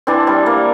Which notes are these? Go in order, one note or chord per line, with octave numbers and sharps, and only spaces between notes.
E3 C4 D4
G3
A#3